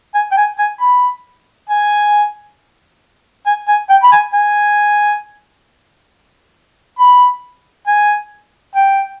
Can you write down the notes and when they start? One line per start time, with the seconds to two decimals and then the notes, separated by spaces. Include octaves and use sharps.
0.14 G#5
0.31 G5
0.37 G#5
0.58 G#5
0.81 B5
1.69 G#5
3.46 G#5
3.68 G#5
3.89 G5
4.03 B5
4.12 G#5
4.34 G#5
6.99 B5
7.87 G#5
8.75 G5